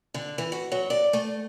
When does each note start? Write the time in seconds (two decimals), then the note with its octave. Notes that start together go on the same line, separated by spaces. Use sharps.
0.14 D3
0.38 E3
0.52 F#4
0.72 F#3
0.90 D5
1.13 A3